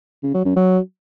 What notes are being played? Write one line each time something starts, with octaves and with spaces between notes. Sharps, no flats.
C#3
F#3
F#2
F#3